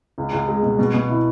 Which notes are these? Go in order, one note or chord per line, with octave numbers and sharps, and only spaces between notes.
C#2
C#2
G#3
B2
B2
B2
E4